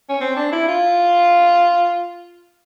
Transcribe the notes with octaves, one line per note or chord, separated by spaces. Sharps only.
C#4
C4
D4
E4
F4